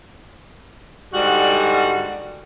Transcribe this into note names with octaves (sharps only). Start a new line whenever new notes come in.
G#2 D3 G3 F#4